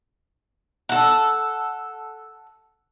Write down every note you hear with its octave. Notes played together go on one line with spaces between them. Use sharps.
A4 F#5